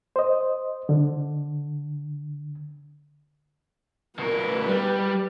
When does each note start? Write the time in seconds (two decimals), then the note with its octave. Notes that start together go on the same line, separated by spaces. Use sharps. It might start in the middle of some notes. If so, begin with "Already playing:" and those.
0.16 C5 D#5
0.89 D3
4.19 B2 A#4 B4
4.68 G3